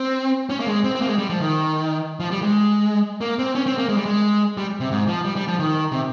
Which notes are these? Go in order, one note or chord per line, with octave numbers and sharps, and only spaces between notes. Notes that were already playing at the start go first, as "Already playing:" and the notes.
Already playing: C4
C#4
A#3
G#3
C4
C4
A#3
G#3
G3
F3
D#3
F3
G3
G#3
A#3
C4
C#4
C4
A#3
G#3
G3
G#3
G3
C3
G#2
F3
G3
G3
F3
D#3
C3